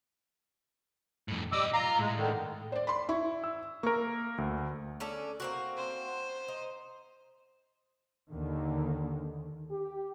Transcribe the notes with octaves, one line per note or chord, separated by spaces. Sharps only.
F2 A2
B1 G3 D#5 D6 E6
F4 F5 A#5
A2 G#3
D3 D#3
C5 D5
B5 C6
E4 C#6
E6
A#3 A#4 C#6
D2
C#4 D4 A4
A#3 C4 F#4
C5
D#4
D#2 D3 D#3
G4